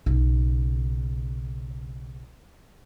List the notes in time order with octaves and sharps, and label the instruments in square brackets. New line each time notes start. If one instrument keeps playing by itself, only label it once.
[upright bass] B1 C#3